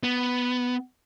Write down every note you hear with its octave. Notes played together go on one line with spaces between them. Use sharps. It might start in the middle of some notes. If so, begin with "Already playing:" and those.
B3